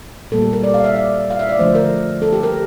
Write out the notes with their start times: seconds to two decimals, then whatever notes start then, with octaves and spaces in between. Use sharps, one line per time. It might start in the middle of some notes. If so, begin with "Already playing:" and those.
0.32 A#2 G3 A#3 A4
0.42 G4
0.53 A#4
0.64 D5
0.74 F5
0.84 E5
0.96 D5
1.30 F5
1.39 E5
1.49 D5
1.58 D3 F3 A3 C5
1.75 A#4
2.22 A4
2.33 G4
2.43 A#4